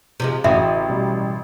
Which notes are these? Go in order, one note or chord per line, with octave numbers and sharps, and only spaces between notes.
C3 F3 G#3
A1 C#3 F#4 E5
B2 G3